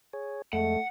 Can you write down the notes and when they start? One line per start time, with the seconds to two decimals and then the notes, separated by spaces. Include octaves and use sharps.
0.13 G#4 C#5
0.53 F2 G#3 A3 F#5